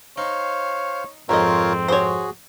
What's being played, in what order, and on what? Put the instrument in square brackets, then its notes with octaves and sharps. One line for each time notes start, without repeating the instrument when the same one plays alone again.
[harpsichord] D#4 [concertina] C5 F5 [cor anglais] C#5
[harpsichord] F2 G#2 [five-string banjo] D#3 D#5 [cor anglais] C4 [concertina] F4 A#4 C#5
[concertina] F#4 G#4 [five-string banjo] C5 C#5